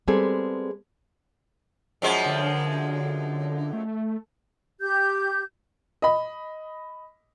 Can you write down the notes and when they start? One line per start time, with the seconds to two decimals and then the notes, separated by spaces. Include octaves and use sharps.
0.08 G3 G#3 B3 C4 G#4 A4
2.02 F#2 F3 G#3
2.26 D3
3.73 A3
4.80 G4 G6
6.02 D#5 B5